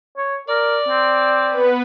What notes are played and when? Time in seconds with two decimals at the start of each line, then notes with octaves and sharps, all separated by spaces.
0.17 C#5
0.49 A#4 D5
0.88 C4
1.48 B3 B4